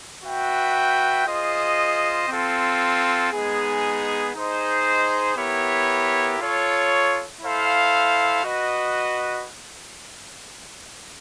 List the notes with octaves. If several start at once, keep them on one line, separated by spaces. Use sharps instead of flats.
F#4 B4 E5 G5
F4 G#4 C5 D#5
C4 F4 A4
G#3 B3 D#4 G#4
D#4 G#4 C5 D#5
B3 E4 G4 A#4 C#5
F4 A4 C#5
E4 A4 C5 F5
F#4 B4 D#5